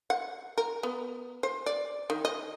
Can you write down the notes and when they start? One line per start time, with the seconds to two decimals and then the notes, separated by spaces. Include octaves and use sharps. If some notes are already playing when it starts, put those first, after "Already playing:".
0.10 F#5
0.58 A#4
0.83 B3
1.43 C5
1.66 D5
2.10 D#3
2.25 D#5